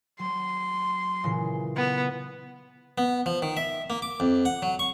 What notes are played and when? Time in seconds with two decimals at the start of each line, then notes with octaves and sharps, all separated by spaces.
0.19 F#3 C6
1.24 A#2 C#3 E3
1.76 B3
2.98 B3
3.26 F3
3.42 D#3
3.57 E5
3.90 A#3
4.02 D6
4.20 F2
4.45 F#5
4.62 F#3
4.79 C#6